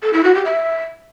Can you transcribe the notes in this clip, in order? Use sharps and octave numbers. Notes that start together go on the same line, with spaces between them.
A4
E4
F#4
G4
E5